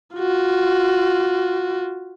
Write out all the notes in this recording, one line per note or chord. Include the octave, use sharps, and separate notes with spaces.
F4 F#4